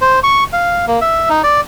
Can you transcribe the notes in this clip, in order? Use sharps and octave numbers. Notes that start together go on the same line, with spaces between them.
C5
C#6
F5
A#3
E5
D#4
D5